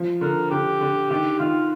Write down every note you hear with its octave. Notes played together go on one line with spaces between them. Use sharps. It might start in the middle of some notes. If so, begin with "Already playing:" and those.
Already playing: F3
D3 A#4
D3 G4
D3
D#3 G4
D#3 F4